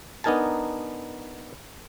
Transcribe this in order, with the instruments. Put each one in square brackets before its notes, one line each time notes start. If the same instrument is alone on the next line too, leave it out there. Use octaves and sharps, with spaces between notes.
[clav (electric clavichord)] B3 D4 D#4 A#4 G#5 A5